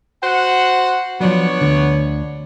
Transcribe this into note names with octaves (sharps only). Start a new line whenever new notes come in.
F#4 C5 F#5
F3 F#3 B3 D4 C#5
D2 D3